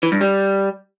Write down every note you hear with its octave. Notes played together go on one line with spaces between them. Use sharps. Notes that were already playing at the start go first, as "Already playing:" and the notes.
E3
G2
G3